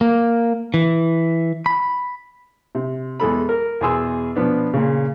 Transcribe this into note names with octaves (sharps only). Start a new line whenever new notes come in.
A#3
E3
B5
C3
E2 G#3 A4 B5
A#4
E2 B2 G#4 C6 E6
B2 F3 B3 D4
A#2 C#3